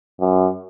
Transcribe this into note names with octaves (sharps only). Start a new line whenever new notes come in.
F#2